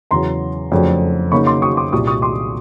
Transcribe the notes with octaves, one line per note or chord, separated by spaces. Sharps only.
E2 C#3 F#3 A#5 C6
F2 C#3 F#3 A3 D4
C#3 F#3 A#3 D#4 B5 C#6
C6 D6
C#6 D#6
C6 D6
C2 A#2 G3 C#6 D#6
C#6 D#6
C6 D6